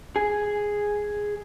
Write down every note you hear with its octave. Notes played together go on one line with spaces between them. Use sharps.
G#4